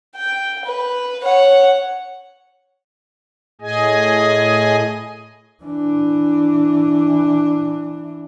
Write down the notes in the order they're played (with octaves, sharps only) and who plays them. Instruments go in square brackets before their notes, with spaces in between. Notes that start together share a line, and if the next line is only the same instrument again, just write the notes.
[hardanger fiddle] G5
B4
C#5 F#5
[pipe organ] A2 G#4 D#5 G#5
[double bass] E3 D4